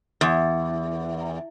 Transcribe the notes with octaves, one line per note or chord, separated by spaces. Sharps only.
E2